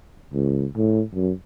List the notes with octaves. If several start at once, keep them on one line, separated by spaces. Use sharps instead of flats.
C#2
A2
F#2